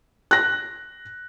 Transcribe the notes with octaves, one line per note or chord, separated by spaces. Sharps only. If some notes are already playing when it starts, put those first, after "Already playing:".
F#6 A#6